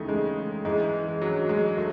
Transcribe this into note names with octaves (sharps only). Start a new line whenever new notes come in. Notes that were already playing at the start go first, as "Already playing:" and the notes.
Already playing: D#2 C#3 E3 A3 D#4
G#3
G#2 E3 G#3
F#3
G#3
F#3 A3